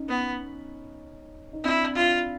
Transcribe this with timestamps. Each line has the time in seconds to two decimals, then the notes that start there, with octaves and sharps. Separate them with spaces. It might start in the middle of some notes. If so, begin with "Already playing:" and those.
Already playing: C#4 D#4
0.08 B3
1.53 D#4
1.64 C4 D4 E4
1.95 F4